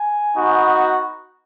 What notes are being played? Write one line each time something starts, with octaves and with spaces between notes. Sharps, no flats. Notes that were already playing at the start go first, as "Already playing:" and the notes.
Already playing: G#5
B3 D#4 F#4